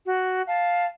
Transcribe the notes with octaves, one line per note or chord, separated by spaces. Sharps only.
F#4
F5 A5